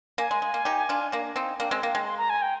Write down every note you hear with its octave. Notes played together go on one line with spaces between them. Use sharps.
A#3 G#5
G#3
G#3
A#3
D#4 G4
D4 F4
A#3 D4
C4 D#4
A#3 D4 G5
G#3 C4
A#3
G#3
C6
A#5
G#5
G5